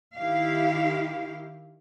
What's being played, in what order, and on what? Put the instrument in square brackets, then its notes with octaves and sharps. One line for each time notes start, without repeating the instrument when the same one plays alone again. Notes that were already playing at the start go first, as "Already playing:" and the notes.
[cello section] D#3 E4 G4 F5